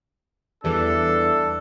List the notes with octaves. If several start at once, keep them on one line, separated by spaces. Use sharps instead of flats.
E2 E3 G3 D4 A4